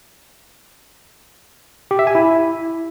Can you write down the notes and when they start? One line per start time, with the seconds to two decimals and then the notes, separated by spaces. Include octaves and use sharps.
1.91 G4
1.99 E5
2.07 G#5
2.15 E4